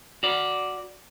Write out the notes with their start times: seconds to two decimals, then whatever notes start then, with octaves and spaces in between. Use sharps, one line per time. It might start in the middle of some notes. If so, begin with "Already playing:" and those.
0.23 F#4 D5